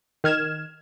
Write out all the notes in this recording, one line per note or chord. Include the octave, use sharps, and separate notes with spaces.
D#3 F6 G#6 E7